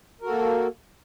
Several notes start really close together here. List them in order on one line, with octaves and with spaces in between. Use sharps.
A#4 F#4 A4 A#3